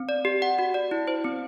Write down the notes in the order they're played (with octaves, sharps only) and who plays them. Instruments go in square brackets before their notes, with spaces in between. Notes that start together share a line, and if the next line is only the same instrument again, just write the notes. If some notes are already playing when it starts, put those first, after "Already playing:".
Already playing: [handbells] C4
D5
G4
F#5
F#4
D5
E4
C5
C4